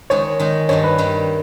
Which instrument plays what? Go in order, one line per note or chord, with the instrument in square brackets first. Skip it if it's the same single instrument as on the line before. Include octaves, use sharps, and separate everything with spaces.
[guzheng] D#3 G#3 D#4 [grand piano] C#5
[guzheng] D#3 G#3 D#4
[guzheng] G2 D#3 G3 [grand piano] C#5
[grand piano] B4
[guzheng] G2 D#3 G3